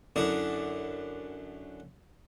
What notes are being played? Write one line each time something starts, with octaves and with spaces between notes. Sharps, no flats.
F#2 D3 E4 D5 D#6